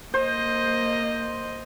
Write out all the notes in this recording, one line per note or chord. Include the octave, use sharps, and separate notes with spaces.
A#3 C5 D#5